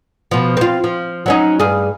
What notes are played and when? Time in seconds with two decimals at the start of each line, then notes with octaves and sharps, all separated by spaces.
0.31 B2 F3
0.57 C4 F4
0.84 F3
1.26 F#3 C#4 D#4
1.60 G2 G#4